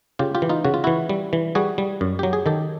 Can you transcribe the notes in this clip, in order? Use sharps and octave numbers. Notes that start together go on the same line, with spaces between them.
C#3 F4 G4
F4 G4
E3
D#4 F4
C#3 F#4
F4
E3 E4 F#4
G3
E3
G3 F#4 G#4
G3
F#2
F#3 G4
G#4
D#3 G4 A4